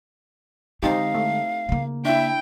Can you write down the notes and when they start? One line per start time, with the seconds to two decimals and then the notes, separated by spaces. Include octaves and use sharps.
0.83 D3 G#3 C4 D#4 G4 F5
1.15 A3
1.69 C#3 A#3
2.05 D4 E4 E5 G5